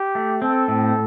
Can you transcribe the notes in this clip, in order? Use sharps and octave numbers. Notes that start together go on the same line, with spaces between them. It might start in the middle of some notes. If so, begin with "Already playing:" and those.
Already playing: G4
A3
C4 A4
A2